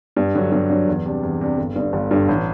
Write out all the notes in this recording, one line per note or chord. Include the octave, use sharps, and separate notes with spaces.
G2
D3 F#3
G2
D3 F#3
E2
C3 G3 D4
E2
C3 G3 D4
G1
G2 D3
G1
G2 D3
A1